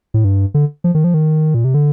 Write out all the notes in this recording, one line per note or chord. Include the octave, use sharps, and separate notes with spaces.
A2
G2
D3
F3
D#3
F3
D#3
A#2
C3
D3